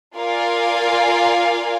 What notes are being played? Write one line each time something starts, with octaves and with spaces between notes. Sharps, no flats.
F4 A#4 D5 F5 G#5